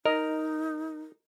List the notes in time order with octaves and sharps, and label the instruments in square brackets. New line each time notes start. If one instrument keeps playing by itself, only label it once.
[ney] D#4 [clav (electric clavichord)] A#4 [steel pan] D#5